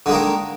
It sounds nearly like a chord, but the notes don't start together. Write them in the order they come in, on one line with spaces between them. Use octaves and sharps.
D3 G#3 A#3 D#3